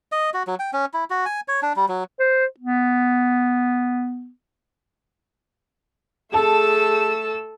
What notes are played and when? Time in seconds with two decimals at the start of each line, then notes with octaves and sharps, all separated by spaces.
0.12 D#5
0.34 F#4
0.47 F#3
0.59 G5
0.73 C#4
0.94 E4
1.10 F#4
1.26 G#5
1.48 C#5
1.62 D4
1.76 G3
1.89 F#3
2.19 C5
2.59 B3
6.34 A3 G#4 A4 A5 E6